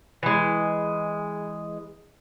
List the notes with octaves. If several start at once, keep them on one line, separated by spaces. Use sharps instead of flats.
E3 G#3